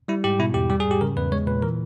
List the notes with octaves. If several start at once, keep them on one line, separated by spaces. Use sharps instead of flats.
G3 E4
G#2 G4
B2 E4
E2 G4
G3 G4
G#4
G#2
G4
C#3 A#4
E2 B4
G#3 C#5
A#2 B4
E3 A#4